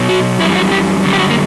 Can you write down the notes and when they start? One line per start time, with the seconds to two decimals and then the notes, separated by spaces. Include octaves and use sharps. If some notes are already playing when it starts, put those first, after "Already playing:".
Already playing: B2 F#3
0.09 F#4
0.40 F#2 E3 G3 E4
0.55 F#4
0.72 G4
1.03 F#2 D3 G3
1.13 G4
1.19 F#4
1.30 A#3